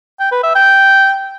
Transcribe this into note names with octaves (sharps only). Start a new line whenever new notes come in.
G5
B4
E5
G5